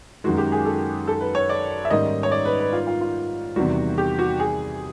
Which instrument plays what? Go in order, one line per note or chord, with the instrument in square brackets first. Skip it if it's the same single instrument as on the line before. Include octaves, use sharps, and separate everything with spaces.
[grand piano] F#2 D#3 G#3 [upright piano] F#4
[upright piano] G4
G#4
A4
A4
B4
C#5
D5
E5
[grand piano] G#2 D#3 G3 A#3 C#4 [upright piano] D#5
[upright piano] C#5
D5
B4
B4
F4
F4
F4
[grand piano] E2 C3 D#3 G3 [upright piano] F#4
[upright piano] G4
F#4
G#4